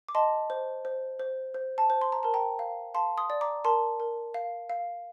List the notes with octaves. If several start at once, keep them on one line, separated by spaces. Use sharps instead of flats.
D6
D#5 A5 C6
C5
C5
C5
C5
A5
C5
C6
A#5
A#4 A5
G5 A#5
F5
F5 A5 C6
C6 D#6
D5
A#5 D6
A#4 A5 C6
A#4
F5
F5